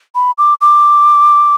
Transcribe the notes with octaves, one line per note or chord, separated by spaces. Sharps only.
B5
D6
D6